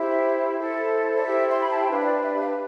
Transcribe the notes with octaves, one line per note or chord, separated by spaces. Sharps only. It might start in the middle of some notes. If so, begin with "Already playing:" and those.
Already playing: E4 G4 C5 E5
E4 A4 C5
D5
E4 G4 C5 E5
C6
B5
A5
G5
D4 G4 B4 F5
E5
D5
E5
F5